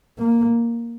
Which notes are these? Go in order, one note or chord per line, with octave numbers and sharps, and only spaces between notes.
A#3